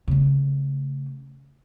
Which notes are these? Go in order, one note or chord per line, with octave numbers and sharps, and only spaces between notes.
C#3 A3